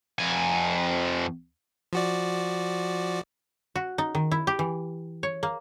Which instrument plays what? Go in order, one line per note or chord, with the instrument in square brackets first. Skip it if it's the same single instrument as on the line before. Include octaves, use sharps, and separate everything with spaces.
[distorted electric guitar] F2 G#5
[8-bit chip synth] F3 F#4 D5
[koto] F#4
D#4
D#3
E4
G4
E3
C#5
A#3